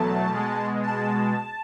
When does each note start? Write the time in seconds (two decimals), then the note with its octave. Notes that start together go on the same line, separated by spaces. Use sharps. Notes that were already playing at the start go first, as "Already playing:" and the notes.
Already playing: E2 B2 F#3 A3 A5
0.29 B2 G#3
0.83 A5